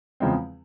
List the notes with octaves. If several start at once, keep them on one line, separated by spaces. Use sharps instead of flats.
E2 C#3 F3 G#3 C4